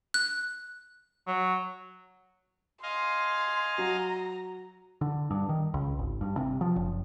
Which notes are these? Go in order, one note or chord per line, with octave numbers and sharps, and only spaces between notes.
F#6
F#3
D#5 F5 G#5 C6
F#3 A#5
D3
G2
D#3
C#2
G#1
G2
C3
F3
F#1